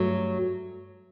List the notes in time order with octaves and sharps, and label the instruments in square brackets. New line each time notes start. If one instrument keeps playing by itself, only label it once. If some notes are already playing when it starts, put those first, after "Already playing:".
Already playing: [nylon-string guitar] G2 F#3 A3